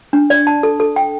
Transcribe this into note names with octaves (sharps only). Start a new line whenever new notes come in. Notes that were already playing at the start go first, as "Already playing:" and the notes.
D4
D5
A5
A4
A4
G5